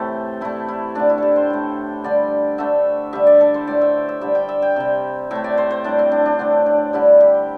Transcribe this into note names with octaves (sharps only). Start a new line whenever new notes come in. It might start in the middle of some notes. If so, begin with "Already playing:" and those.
Already playing: A2 C3 E3 A3 G4 A4 C5
A2 A3 E4
E4
D3 A3 D4
E4
G4 A4
C5
A2 A3
D3 G3 D5
D3 A3 E5
D3 G3 E5
D5
A4
C5
A2 A3 D5
E5
E5
D3 G3 E5
G5
E5
G5
C3 G3
A2 A3 E5
D5
C5
C5
A2 G3 D4
C4
D4
D4
D3 A3 C4
D4
D3 G3 E4
G4